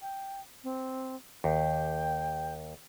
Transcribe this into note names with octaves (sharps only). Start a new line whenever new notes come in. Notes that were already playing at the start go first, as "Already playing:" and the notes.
G5
C4
D#2 G5